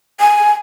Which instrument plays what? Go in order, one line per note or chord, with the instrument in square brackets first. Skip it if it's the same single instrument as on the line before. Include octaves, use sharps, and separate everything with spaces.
[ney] G#5